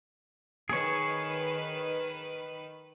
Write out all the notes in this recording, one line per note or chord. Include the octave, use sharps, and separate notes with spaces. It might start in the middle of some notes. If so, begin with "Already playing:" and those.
D#3 G#4 B4 C#5